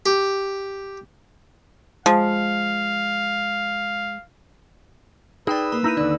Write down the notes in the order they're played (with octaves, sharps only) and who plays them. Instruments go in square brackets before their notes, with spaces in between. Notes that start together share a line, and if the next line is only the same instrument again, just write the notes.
[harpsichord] G4
[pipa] F3 [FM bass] G#3 [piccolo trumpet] F5
[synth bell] D#4 G5 B5 [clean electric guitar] G#4 D5 [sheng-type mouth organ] B4 E6
[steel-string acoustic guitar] A#3 [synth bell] B5
[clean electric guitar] D#4 E4 A#5 [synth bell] A#6 D#7
[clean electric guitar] D#2 D3 [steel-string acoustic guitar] D4 [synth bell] D#4